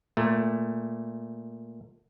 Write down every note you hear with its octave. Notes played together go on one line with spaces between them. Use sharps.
A#2 A3